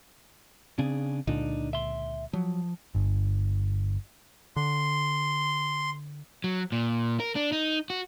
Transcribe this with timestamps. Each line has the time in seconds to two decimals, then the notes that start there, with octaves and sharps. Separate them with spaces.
0.79 C#3 C4 D4 G#4
1.27 C#2 A#2 D3 D4 D#4
1.73 E5 C6
2.33 F3 F#3
2.95 G1
4.56 D3 C6
6.44 F#3
6.72 A#2
7.20 A#4
7.36 D4
7.52 D#4
7.90 F#4